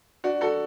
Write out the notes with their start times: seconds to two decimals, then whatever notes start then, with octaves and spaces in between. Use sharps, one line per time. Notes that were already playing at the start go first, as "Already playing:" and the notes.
0.24 D4 F#4
0.41 F#4 A4